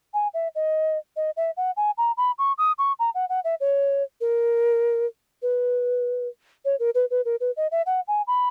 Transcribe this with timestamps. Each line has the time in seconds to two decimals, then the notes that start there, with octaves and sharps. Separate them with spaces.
0.14 G#5
0.34 E5
0.55 D#5
1.16 D#5
1.37 E5
1.57 F#5
1.77 G#5
1.98 A#5
2.17 B5
2.38 C#6
2.58 D#6
2.78 C#6
2.99 A#5
3.15 F#5
3.29 F#5
3.44 E5
3.60 C#5
4.21 A#4
5.42 B4
6.65 C#5
6.79 A#4
6.95 B4
7.11 B4
7.25 A#4
7.40 B4
7.57 D#5
7.71 E5
7.86 F#5
8.08 G#5
8.27 B5